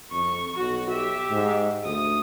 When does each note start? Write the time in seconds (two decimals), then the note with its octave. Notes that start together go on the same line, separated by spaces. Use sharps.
0.11 F2 C#6
0.58 B1 F#4
0.90 G4 E5
1.31 G#2
1.85 D2 D#6